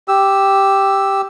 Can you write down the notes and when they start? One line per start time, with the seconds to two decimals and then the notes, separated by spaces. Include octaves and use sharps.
0.08 G4 E6